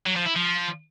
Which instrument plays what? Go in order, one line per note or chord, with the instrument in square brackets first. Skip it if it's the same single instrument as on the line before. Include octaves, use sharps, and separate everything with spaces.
[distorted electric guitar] F#3
F3
E4
F3